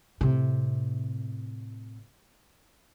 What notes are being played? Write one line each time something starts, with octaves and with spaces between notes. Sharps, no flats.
A2 C3